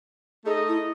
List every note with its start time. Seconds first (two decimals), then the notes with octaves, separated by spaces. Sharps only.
0.45 A3 D#4 G#4 A4 D#5
0.68 E4